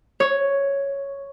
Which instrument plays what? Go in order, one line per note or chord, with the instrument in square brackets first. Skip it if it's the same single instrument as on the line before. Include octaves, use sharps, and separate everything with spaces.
[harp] C#5